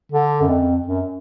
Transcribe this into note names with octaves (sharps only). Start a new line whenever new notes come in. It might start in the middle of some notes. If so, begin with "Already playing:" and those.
D3
F#2
F2
F#2